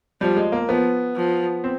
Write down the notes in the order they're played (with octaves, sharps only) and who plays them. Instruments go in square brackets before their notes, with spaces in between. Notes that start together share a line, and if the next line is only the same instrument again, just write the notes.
[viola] F3 [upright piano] G3
[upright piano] G#3
A#3
[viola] F3 [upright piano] B3
[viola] F3
[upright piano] C4